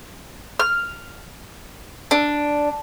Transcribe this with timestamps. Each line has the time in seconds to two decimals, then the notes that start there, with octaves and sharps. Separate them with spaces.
0.60 F6
2.11 D4